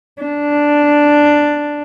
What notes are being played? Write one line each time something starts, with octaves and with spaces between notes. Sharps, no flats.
D4